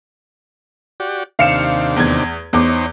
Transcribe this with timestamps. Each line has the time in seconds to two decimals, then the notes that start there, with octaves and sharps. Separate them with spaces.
1.00 F#4 G4 D5
1.39 D#2 C3 D4 F5 C#7 E7
1.96 E2 G#6
2.53 E2 D#4 C5 C#5 D6